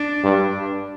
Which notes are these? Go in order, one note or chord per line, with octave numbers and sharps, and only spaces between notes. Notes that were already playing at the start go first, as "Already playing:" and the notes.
Already playing: D4
G2